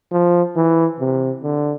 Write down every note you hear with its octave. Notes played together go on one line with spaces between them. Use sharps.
F3
E3
C3
D3